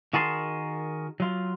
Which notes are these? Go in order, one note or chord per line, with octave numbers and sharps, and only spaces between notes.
D#3 F#4 G#4 A#4 A5 C6
F#3 F4